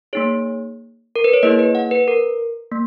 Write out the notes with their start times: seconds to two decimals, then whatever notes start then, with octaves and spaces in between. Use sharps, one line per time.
0.13 A#3 D#4 G#4 C#5
1.16 A#4
1.24 B4
1.33 C#5
1.43 A#3 E4 G#4 D#5
1.59 B4
1.75 F#5
1.91 B4
2.08 A#4
2.72 A#3